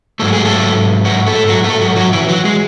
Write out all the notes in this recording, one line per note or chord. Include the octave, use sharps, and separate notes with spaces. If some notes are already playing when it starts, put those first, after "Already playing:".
G#2 F#3 A3 A4
G#4
A3 A4
F#3 F#4
A3 A4
F#3 F#4
A3 A4
F#3 F#4
F#3 F#4
E3 E4
F#3 F#4
G#3 G#4